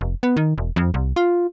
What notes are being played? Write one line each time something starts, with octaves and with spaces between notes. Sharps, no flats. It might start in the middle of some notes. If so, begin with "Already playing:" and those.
F1
B3
D#3
E1
F2
C2
F4